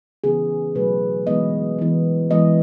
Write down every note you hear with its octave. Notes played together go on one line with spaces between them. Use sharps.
C#3 E3 B3 G#4
B2 F#3 A3 B4
E3 G#3 B3 D#5
E3 B3
E3 G#3 B3 D#5